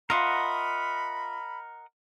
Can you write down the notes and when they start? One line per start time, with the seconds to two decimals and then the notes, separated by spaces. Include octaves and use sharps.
0.10 F4 A#4 D#5 E5 F#5 B5